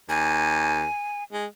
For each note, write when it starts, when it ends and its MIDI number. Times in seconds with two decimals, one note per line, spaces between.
0.09 0.85 39
0.09 1.24 80
1.32 1.45 56